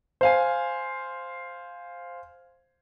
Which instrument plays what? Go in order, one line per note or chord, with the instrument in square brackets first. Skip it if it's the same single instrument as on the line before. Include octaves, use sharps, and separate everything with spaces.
[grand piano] C5 F5 G#5